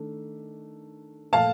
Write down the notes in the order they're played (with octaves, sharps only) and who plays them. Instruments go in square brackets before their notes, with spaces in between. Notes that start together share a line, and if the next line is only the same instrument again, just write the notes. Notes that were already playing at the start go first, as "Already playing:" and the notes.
Already playing: [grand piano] D#3 A3 D4
[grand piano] A#2 F3 A3 [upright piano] F5 A5